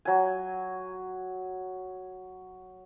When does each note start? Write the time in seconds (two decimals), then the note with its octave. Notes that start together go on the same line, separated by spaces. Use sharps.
0.05 F#3 G#5